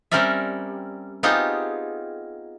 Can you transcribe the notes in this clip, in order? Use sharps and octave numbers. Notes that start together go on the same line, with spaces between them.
G3 C4 C#4 A#4 D5 E5
B3 C4 D#4 F4 G4 G#4